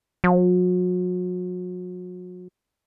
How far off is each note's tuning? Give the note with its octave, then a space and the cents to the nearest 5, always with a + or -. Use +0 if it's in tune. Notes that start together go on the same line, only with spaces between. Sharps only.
F#3 -40